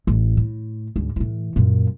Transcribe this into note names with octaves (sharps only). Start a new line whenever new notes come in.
A1
A2
D2 G#2
A2 E3
F#2 A#2